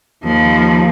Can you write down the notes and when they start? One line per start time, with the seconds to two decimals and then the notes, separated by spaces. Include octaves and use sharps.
0.23 D#2 F3